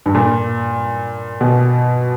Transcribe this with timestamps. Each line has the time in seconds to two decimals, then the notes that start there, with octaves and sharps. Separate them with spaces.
0.06 G2
0.15 A#2
1.41 B2